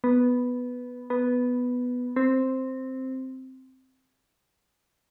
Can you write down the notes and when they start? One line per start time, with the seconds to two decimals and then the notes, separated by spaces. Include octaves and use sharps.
0.04 B3
1.10 B3
2.16 C4